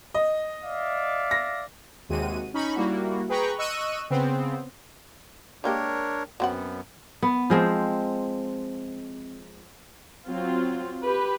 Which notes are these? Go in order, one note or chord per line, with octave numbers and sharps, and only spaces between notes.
D#5
D5 E5 F5
A#6
D#2 C3 G#3 F#4 D#7
C#4 D#4 B5 C#6
G3 A#3 E4 F#4
G#4 B4 G5 A#5 B5 C#6
D#5 C#6 E6 F#6 D#7
C#3 B3 C4
G#3 A#3 D4 G4 A#4 C#5
F#2 F#3 B3 C4 F#5
B3
F3 G#3 C4
F#3 C4 F4
G4 B4